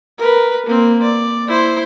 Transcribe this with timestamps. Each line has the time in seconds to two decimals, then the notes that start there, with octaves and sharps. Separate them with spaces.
0.18 A#4 B4
0.66 A#3 C4
1.02 D5
1.48 E4 C5